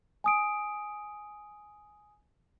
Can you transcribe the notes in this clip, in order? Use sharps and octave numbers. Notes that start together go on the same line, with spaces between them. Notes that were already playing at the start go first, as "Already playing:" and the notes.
G#5 D#6 D7